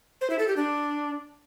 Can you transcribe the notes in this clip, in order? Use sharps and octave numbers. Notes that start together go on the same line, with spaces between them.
C5
E4
A4
G4
D4